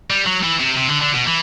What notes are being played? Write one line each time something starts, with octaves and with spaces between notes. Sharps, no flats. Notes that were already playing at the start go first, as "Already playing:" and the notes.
G3
F#3
E3
C3
C3
D3
D3
B2
E3